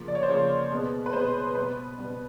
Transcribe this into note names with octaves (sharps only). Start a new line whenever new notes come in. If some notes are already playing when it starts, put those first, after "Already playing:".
Already playing: C#3 F3 A#3
D5
C#5
C5
C#3 F3 A#3 C#5
B2 G#3 B3
B4
B2 G#3 B3 C5
B2 G3 B3 B4
B2 G3 B3